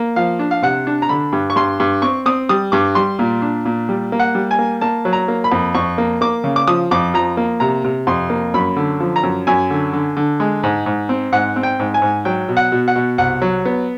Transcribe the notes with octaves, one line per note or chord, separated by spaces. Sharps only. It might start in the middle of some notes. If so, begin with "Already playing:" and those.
Already playing: A#3
F3 F5
D4
F5
C3 F#5
D4
A#5
D3 B5
G2
C#6
G2 C6
G2
C4 C#6
C4 D#6
G3 D#6
G2 D6
G3 C6
A#2
D4
A#2
G3
A#3
F#5
G3
G#5
A#3
A#3 A5
F#3
A#5
A#3
B5
F2
F2 C#6
A#3
A#3 D6
C#3
D6
F3 D#6
F2 D6
F3 A#5
A#3
C3 A#5
C3
F2 C6
A#3
F#2 B5
D3
F3
A#5
F#2
F#2 G#5
D3
D3
D3
G#3
G#2
G#2
C4
G#2 F#5
C4
G5
G#2
G#5
G#2
F#3 G5
B2
F#5
B2
F#5
B2
C2 F#5
F#3
B3